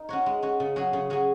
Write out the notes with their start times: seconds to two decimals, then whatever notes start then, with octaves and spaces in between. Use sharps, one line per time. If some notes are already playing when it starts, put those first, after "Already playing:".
Already playing: D#4 A#4
0.09 C#4 F#4 C#5
0.26 G#3
0.42 C#4 F#4 C#5
0.60 C#3
0.76 F#3 C#4 G#4
0.93 C#3
1.10 F#3 C#4 G#4